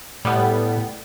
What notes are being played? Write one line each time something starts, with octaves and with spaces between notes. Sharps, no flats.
A2 G3 B3